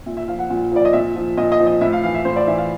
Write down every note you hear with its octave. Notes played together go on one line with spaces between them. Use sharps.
A#2 E5
E5
F3 F5
F#5
A#2
F3 D5
D#5
A#2 E5
F3
A#2 D#5
D#5
F3
D#5
A2 E5
F5
E3 F5
E5
A2 C5
D5
E3 E5
F5